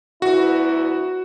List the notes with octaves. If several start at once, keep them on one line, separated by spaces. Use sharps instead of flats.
D2 B3 E4 F#4